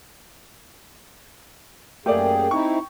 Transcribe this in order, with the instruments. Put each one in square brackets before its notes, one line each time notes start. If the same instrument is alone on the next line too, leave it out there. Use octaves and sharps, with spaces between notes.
[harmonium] F#2 G#4 [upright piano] A3 A#3 D5 [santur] G4
[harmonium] C4 D#4 E4 [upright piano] C#6